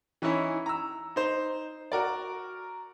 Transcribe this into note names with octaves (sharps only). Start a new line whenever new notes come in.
E3 C#4 D#4 E4
A#5 E6
D#4 C5
F#4 A#4 D5